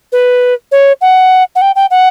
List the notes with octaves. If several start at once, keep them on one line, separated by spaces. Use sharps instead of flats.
B4
C#5
F#5
F#5
G5
G5
F#5